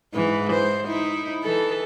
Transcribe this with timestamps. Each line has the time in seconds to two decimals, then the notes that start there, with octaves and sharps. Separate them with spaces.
0.14 G#2 E3
0.53 C5
0.87 D#4 E4
1.43 E3 A4